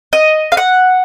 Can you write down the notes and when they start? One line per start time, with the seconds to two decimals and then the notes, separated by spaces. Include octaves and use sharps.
0.13 D#5
0.52 F5
0.57 F#5